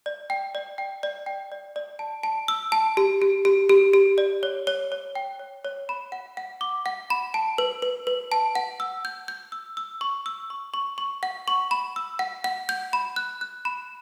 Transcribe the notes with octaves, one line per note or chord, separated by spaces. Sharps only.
D5
G5
D5
G5
D5
G5
D5
D5
A5
A5
E6
A5
G4
G4
G4
G4
G4
D5
C#5
C#5
C#5
G5
C#5
C#5
B5
F#5
F#5
D6
F#5
B5
A5
B4
B4
B4
A5
F#5
E6
G6
G6
E6
E6
C#6
E6
C#6
C#6
C#6
F#5
C#6
B5
E6
F#5
F#5
G6
B5
F#6
F#6
B5